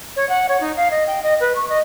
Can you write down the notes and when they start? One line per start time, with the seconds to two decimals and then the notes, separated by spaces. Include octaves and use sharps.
0.16 C#5
0.29 F#5
0.49 C#5
0.61 D#4
0.76 F5
0.91 D#5
1.07 G5
1.23 D#5
1.40 B4
1.55 C#6
1.69 D#5